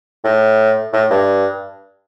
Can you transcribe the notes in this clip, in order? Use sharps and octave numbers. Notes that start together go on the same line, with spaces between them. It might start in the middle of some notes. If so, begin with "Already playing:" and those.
A2
A2
G2